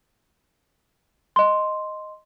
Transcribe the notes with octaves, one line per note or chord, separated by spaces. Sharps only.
D#5 C6